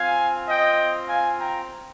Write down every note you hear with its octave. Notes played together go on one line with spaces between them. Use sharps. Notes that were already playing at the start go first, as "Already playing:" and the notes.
Already playing: C4 F4 F5 G#5
D#5 G5
F5 G#5
G5 A#5